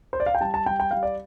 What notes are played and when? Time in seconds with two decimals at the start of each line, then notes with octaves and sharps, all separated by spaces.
0.13 C5
0.20 D5
0.26 F5
0.35 G5
0.40 G3 A5
0.54 A5
0.66 G3 G5
0.80 G5
0.91 G3 F5
1.03 D5